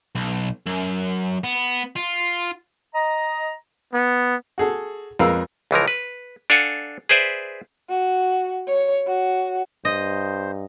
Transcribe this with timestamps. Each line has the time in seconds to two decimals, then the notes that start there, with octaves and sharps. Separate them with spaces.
0.15 B1
0.66 F#2
1.44 B3
1.96 F4
2.95 D#5 A#5
3.93 B3
4.58 F#4 G#4 A4
5.19 F2 G#3 A#4 B4 F5 E6
5.71 C#2 E3 F3 A#4
5.88 B4
6.50 D4 A4 F5 F#5 G#5
7.09 G#4 B4 C5 D5 E5
7.89 F#4
8.68 C#5
9.07 F#4
9.85 G2 C5 D#5